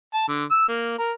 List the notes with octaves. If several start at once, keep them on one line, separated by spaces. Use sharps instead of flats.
A5
D3
E6
A#3
A#4